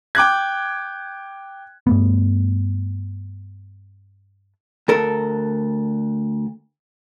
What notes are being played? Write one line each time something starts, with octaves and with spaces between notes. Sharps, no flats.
G5 D6 F#6 G#6
G2 A3 B3
D2 A4 A#4